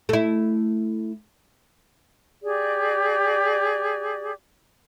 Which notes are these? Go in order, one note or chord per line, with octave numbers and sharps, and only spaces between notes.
A3 E4
G4 G#4 D5